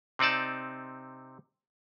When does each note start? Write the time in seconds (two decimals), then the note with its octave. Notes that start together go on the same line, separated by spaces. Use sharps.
0.19 C3 C4 D#4 D5 A5